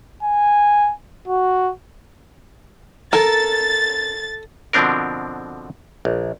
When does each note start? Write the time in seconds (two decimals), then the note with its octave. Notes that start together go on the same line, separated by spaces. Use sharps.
0.23 G#5
1.28 F#4
3.13 A4 A#4 A6
4.73 B2 D3 F3 C4 D4 A#4
6.05 A#1